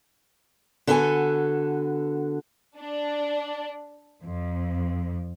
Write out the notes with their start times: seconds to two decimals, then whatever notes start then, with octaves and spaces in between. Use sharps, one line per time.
0.87 D3 B3 F#4 A4 F#5 G#5
2.78 D4
4.23 F2